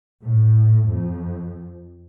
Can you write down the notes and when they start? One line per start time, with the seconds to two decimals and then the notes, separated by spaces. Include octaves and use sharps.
0.22 A2
0.88 F2